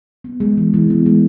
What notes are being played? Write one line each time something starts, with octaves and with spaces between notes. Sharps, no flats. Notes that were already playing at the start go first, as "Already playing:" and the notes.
B3
G#3
E3
E3
B3
G#3